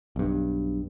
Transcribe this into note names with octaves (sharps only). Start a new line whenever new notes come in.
B1 G2